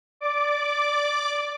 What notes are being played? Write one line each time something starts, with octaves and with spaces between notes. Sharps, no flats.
D5 D6